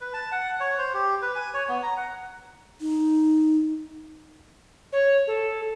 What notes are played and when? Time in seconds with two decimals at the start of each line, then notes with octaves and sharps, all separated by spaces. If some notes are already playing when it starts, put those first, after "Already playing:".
0.01 B4
0.13 A5
0.32 F#5
0.60 C#5
0.79 C5
0.94 G4
1.22 B4
1.35 G#5
1.54 C#5
1.69 B3
1.83 A#5
1.97 F#5
2.81 D#4
4.93 C#5
5.27 A4